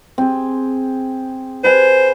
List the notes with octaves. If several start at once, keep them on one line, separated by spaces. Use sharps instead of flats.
C4 G#4
B4 C5 F#5 G#5